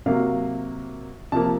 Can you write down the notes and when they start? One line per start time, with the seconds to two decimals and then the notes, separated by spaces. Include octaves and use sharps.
0.06 C3 F#3 A#3 F5
1.32 C3 F3 A#3 A5